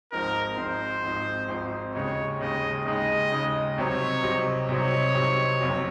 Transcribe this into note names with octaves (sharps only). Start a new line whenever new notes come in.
G#1 G#2 F3 C4 D#4 A#4
G#1 G#2 F3 C4 D#4 C5
G#1 G#2 F3 C4 D#4
G#1 G#2 F3 C4 D#4
D#2 C#3 G#3 D#4 C#5
D#2 C#3 G#3 D#4 D#5
D#2 C#3 G#3 D#4 D#5
D#2 C#3 G#3 D#4
C2 C3 F#3 C4 D#4 C#5
C2 C3 F#3 C4 D#4
C2 C3 F#3 C4 D#4 C#5
C2 C3 F#3 C4 D#4
F#1 F2 C3 F#3